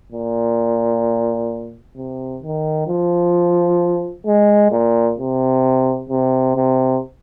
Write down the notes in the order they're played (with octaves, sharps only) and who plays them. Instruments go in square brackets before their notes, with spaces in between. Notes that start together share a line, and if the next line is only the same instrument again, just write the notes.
[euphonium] A#2
C3
D#3
F3
G#3
A#2
C3
C3
C3